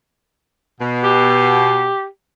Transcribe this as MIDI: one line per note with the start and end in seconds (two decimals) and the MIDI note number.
0.81 1.91 47
1.04 2.05 67